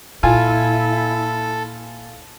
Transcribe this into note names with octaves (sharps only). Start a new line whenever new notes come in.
A#2 E4 F4 A4 G#5